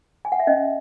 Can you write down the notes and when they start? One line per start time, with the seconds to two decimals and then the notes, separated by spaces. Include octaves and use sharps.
0.25 G#5
0.32 F#5
0.40 E5
0.47 C#4 D#5